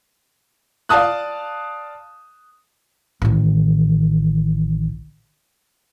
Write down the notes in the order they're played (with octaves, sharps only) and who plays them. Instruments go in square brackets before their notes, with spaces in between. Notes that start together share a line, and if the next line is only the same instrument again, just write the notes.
[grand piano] D5 F5 A5 D#6 F#6
[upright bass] A1 D#3